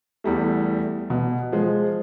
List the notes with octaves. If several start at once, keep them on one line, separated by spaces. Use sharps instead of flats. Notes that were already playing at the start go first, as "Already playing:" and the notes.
E2 G3 A3
B2
F3 G#3